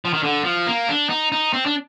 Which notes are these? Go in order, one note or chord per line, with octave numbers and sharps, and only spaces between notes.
F3
D#3
D3
F3
A#3
D4
D#4
D#4
C4
D4